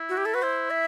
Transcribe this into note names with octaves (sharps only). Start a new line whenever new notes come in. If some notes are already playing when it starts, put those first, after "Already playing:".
Already playing: E4
F#4
G4
A4
F#4 B4
E4 C5
E5